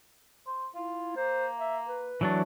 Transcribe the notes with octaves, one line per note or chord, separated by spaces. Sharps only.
C5
E4 F4
A#3 C5
E5
B4
E3 F#3 A3 D4